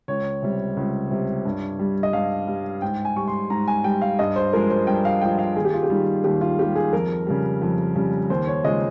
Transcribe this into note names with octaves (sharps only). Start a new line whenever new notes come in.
C#2 C#5
C3 G3
C#2
C3 G3
G2
G3
D#5
G2 F5
G3
G#2 G5
G#5
G3 C#6
C6
G#2 A#5
G#5
G3 G5
F5
G2 D#5
C5
F3 G#3 A#4
C5
G2 G5
F5
F3 G#3 G5
F5
D#2 G#4
G4
F4
G4
D#3 G3
D#2 G4
F4
D#3 G3 G4
G#4
F2 A#4
C#3 G3
F2
C#3 G3
D#2 C5
C#5
C#3 F3 G#3 D#5